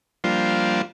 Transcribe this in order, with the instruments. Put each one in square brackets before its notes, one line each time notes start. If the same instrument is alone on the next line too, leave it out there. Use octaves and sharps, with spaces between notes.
[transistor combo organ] F3 G3 A#3 D4 F4 C5